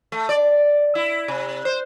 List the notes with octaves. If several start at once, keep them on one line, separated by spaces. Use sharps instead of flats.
A3
D5
E4
C3
C5